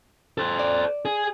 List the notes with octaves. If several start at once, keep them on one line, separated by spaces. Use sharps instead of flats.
A4 C5
D5
G#4